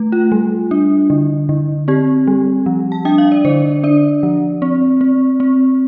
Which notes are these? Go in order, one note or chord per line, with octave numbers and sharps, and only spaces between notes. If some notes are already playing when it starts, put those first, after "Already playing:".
Already playing: A3
F4
G3
D4
D3
D3
C4 G4
G3
F3
A5
D4 G5
F5
D5
D3 C5
D4 D5
F3
C4
C4
C4